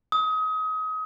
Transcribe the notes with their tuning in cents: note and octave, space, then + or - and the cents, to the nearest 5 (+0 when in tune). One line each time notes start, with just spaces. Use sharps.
D#6 +30